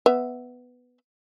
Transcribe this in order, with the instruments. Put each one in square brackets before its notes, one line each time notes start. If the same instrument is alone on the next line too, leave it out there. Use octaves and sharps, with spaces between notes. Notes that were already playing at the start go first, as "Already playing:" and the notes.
[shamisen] B3 E5